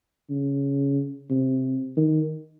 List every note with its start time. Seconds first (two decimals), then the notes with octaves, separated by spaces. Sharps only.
0.30 C#3
1.30 C3
1.97 D#3